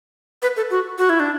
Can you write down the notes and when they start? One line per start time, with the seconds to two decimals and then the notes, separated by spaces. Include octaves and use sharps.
0.42 B4
0.57 A4
0.71 F#4
0.98 F#4
1.09 E4
1.20 D4